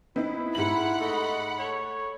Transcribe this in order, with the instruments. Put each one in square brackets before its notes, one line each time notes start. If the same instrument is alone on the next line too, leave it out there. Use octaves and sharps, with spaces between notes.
[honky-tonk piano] B3 C4 D#4 [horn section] E4
[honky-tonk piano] G#2 G4 F#7 [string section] F#5 B5
[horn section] A3 D#5
A3 C#5